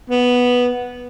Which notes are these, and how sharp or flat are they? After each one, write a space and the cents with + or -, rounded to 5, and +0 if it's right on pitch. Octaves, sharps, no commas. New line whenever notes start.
B3 -5